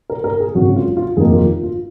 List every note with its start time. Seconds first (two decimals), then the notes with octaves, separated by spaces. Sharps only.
0.10 A#4
0.24 A#4
0.40 G#4
0.55 G#1 F#2 C#3 F#4
0.76 F4
0.97 F4
1.17 F1 D#2 D#3 A#3 G#4
1.33 F4
1.63 F4